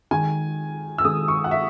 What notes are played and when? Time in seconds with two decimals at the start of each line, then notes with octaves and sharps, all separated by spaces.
0.11 D#3 G#3 G#5
0.98 E6
1.04 D#3 G#3 D#6
1.28 C#6
1.44 F#5
1.51 E5